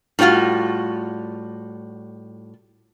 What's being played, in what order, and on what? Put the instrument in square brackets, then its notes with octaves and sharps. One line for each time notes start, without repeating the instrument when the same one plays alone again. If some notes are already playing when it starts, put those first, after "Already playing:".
[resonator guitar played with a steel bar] A2 G3 C#4 F4 F#4